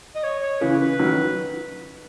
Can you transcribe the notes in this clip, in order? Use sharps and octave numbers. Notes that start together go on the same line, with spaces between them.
D#5
C#5
C#5
C#3 E3 B4
B4
D#3 F#3